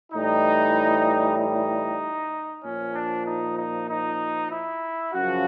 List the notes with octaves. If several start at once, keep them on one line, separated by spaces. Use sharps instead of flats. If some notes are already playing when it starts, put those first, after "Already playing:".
A2 E3 G3 D#4
D#4
A#2 F3 C#4
D4
D#4
D#4
D#4
E4
F#2 C#3 F3 F#4